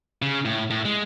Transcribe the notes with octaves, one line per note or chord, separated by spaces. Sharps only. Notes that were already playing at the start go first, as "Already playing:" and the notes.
C#3
A2
A2
G#3